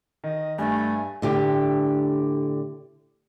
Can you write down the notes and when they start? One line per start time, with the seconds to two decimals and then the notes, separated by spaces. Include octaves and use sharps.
0.24 D#3 D#5
0.58 G2 A3 G#5
1.22 A2 D3 G4